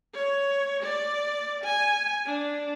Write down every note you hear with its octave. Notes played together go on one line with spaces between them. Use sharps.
C#5
D5
G#5
D4